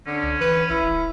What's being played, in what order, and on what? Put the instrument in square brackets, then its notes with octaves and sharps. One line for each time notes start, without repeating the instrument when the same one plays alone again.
[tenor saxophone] D3 [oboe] C#4
[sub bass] C#2
[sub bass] E3 [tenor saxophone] B4
[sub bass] A#1 [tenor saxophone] E4
[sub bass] D1